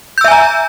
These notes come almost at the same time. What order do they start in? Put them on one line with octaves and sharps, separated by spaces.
G6 E6 E5 G#5 A#5